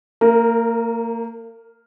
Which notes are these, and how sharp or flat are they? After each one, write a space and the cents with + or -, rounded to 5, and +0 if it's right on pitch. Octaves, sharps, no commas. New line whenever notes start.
A#3 -35 A#4 +0